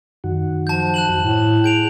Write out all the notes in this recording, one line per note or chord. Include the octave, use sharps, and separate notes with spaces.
F#2 D#3 F#4
F3 A5 G6
F#6 E7 F#7
A2
G#4 G6 D7 F7